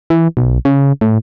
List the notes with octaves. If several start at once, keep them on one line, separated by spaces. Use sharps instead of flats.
E3
B1
C#3
A2